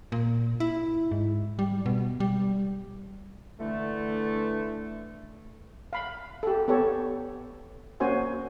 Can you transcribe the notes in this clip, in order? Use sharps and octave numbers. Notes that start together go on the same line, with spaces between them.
A#2
E4
G#2
G3
B2
G3
D3 E3 A3
F5 B5
G4 A4
B3 G4 A4 C#5
A#3 C#4 F#4 C5 G#5